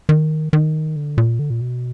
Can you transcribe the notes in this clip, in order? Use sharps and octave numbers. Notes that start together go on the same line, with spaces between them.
D#3
D#3
D3
A#2
D3
A#2
B2